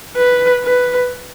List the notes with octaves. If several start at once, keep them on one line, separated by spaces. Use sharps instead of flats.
B4
B4